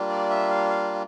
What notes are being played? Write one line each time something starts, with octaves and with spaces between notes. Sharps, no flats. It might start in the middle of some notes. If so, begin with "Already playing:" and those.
Already playing: G3 A#3 D4 F4
D5
E5
F5
F5